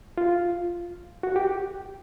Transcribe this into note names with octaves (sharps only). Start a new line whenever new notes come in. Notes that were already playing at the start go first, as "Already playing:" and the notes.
F4
F#4
G4